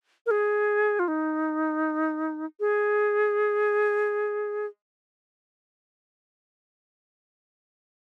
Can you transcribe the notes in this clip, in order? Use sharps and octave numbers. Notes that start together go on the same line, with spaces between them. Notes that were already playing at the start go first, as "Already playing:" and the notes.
A#4
G#4
F4
D#4
G#4